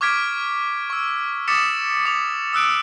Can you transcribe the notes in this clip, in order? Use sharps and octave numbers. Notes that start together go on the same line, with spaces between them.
C#6 D6 F6 G#6 B6 D7
C#6 E6
D6 D#6 A6 B6 C#7 E7
D6 F7
D#6 E6 F#6 D7